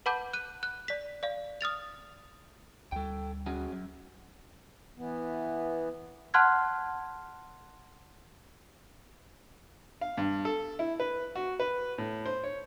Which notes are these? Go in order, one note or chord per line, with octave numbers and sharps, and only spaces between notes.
B4 F#5 A5 B5 D6 G6
F#6 D#7
F#6
D5 B6
D5 F5
D#6 F6 A6 F7
D2 G3 A4 G5
C#4 F#4 G#4
F#2
E3 B3
F#5 A5 C6 F6 F#6 G#6
F5
G2
A4
E4
B4
F#4
B4
A2
C5
C#5